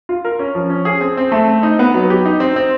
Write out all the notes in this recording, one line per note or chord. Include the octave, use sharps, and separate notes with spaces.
F4
A#4
C#4
F3
C#4
G#4
C4
C4
A3
C4
D#4
B3
F#3
G4
D#4
C4
C4